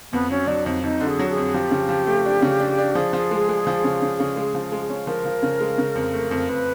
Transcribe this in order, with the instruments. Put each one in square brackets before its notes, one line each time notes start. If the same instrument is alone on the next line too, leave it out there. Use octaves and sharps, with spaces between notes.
[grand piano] F2 [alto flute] B3
[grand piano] F#3 [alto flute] C#4
[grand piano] F#3 [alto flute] D4
[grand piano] F2 [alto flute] D#4
[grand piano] F2 [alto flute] D#4
[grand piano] D3
[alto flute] G#4
[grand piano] F#3
[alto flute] G#4
[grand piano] F2
[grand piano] F3 [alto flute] G4
[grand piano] C#3
F3
A3
D4
C#3
D4
D4
[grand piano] F3 [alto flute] G#4
[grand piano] F3
G#3
G#3
F3
C#3
C#3
C#3
G#3
F3
G#3
C#4
[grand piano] F3 [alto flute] A#4
[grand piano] F3
C#3
G#3
C#3
F2
A3
F2
[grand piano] F2 [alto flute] B4